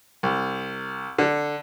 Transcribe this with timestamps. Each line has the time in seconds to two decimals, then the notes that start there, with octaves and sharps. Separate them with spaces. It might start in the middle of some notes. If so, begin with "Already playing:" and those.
0.23 C2
1.18 D3